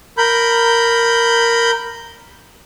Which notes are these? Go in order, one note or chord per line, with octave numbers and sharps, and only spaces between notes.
A#4 B5 G6